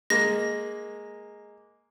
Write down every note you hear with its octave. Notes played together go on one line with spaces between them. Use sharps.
G#3 A#3 A#6